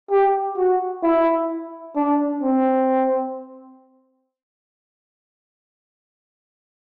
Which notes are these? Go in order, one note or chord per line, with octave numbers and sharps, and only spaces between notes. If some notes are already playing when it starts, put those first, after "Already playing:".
G4
F#4
E4
D4
C4